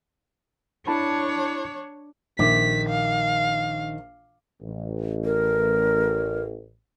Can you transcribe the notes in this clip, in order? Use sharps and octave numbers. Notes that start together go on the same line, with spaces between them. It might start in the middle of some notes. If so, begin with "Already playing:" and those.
D4 E4 C#5 A5 B5
A#1 D#3 E5 D6 B6
F5
A1
A#4